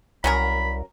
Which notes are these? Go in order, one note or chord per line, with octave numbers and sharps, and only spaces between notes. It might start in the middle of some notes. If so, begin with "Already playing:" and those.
C2 F#3 C#4 A#4 B5